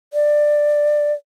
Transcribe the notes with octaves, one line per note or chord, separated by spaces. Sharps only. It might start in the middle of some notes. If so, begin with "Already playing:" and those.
D5